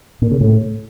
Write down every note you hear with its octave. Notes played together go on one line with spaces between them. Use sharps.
A#2
C#3
A2